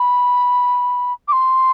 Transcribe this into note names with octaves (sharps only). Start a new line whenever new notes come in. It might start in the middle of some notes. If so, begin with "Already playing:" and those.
Already playing: B5
D6
C6